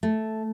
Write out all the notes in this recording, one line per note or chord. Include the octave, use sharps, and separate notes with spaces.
A3